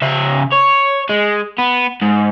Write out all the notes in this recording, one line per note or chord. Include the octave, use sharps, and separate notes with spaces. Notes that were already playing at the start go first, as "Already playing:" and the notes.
C#3 E5
C#5
G#3
B3
G#2